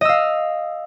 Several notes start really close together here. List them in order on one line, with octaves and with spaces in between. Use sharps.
D#5 E6 F5